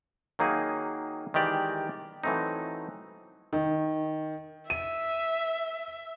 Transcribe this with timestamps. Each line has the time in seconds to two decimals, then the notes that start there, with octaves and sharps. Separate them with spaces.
0.39 D#3 F#3 A#3 D#4 G#4
1.34 D#3 E3 G#3 G4 D5
2.24 E3 F#3 A3 C4 D#4
3.53 D#3
4.70 E5 D#7